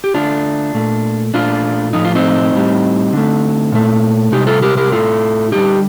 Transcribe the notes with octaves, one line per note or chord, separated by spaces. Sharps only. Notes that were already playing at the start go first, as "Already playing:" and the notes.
G4
D3 A3 D4 F4
A#2 A3
A#2 A3 D4 F4
A2 F3 A3 D#4
F4
C4 D#4
A2 G3
D3 A3
A#2 A3
C3 G3 D#4 G4
F4 A4
G4 A#4
G4 A#4
A2 A3 F4 A4
D3 G3 D#4 G4